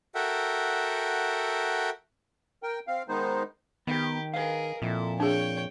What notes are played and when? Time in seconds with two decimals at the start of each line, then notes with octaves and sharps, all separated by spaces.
0.15 F#4 A4 A#4 E5 F#5 G5
2.63 A#4 G5
2.87 C4 F5
3.09 D#3 G#3 B3 D#4 C5
3.87 D#3 B3 G4
4.34 G#4 A#4 B4 F5
4.82 F2 A#2 E4 A4
5.20 D4 G#4 C#5 G5